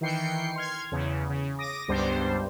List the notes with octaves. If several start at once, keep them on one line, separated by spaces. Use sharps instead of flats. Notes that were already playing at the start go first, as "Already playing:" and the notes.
D#3 E3 G5 C7 C#7
C6 F6 G#6
E2 C#3
C#3
D6 D#6 A#6
C#2 G2 G3 B3 D4 C5